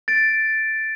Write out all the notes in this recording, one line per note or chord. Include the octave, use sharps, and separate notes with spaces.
A6 D7